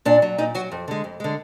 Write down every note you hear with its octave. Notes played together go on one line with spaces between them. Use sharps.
A#2 D4
F#3
A#2 D#4
F#3 F#4
F2
D3 G#3
F2
D3 G#3